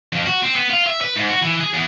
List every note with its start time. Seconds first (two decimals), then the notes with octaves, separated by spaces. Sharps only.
0.13 F2
0.26 F#4
0.43 C4
0.56 B3
0.70 F4
0.87 E5
1.02 B4
1.16 G#2
1.30 F#4
1.43 E3
1.61 G#4
1.74 E2